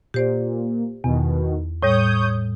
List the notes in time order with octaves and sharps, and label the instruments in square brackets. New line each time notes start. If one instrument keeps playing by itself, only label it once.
[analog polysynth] A#2 [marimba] G4 C5 D5
[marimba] E2 [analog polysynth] B2 D#3
[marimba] A2 G3 [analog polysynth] C#5 D#6 G6